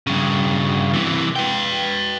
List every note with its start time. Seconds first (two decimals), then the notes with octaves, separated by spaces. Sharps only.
0.07 G2 C#3
0.94 C3 E3
1.36 B4 G5